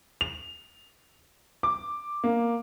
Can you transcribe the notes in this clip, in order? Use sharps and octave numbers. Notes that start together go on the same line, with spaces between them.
F7
D6
A#3